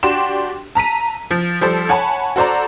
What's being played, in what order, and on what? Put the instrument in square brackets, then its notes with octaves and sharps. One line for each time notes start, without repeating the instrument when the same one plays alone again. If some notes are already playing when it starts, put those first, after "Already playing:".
[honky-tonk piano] D4 F#4 G4 G5 C6 E7
A5 A#5 B6 D#7
F3
F3 G3 A4 C5
C#5 F#5 G#5 A5 B5
F#4 A4 C5 D5 A#5